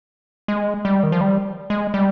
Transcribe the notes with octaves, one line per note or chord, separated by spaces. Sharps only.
G#3
G3
D#3
F3
G3
G#3
G3